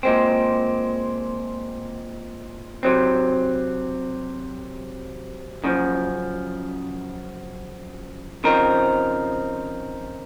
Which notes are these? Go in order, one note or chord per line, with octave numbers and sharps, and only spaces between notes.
A#2 G#3 C4
C3 F#3 C4
F#2 C#3 F3
C#3 F3 C4 D#4 A#4